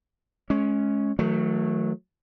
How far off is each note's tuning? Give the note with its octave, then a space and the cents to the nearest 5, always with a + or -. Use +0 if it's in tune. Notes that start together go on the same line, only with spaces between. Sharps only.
G#3 +30 C#4 +0
D#3 +35 F#3 -20 A3 +0